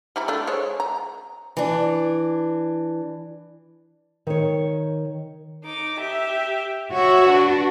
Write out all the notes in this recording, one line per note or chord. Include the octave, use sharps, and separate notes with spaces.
G3 E4 A#5
A3 D4 F4
G#3 C5 C#5
A#5
E3 D4
D#3 C#5
D#4 D6
G4 E5
F#4 C#5 E5
D4 B4